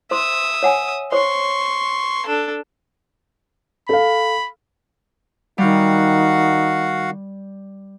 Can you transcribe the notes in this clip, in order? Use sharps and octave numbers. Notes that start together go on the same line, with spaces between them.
C5 E5 C6 D#6
C#5 F#5 G#5
C5 C#5 C6 C#6
D4 A4
A4 F5 B5
D#3 G3 F#4 F5 F#5